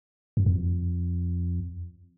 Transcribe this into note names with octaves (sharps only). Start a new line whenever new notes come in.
F#2
F2